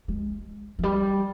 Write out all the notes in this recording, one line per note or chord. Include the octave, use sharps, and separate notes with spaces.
G#3
E3
G3